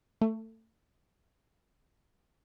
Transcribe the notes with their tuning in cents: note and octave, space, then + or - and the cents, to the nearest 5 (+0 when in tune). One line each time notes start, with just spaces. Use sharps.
A3 +20